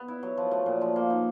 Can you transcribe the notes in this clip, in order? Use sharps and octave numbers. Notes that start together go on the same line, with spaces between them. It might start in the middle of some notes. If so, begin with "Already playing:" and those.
Already playing: B3
E4
F#3
F3
A3
A#2
F3
A#3
D#4